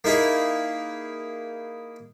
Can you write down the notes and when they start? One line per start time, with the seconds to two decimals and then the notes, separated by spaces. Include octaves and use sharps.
0.04 A#3 D#4 E4 G#4